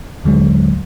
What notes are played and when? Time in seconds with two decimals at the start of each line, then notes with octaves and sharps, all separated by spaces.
0.24 D#2 A2 D3 F#3 G#3